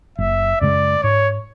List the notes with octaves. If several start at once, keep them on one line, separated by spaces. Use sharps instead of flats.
F#1 E5
F#2 C#3 G#3 D5
G#2 C#5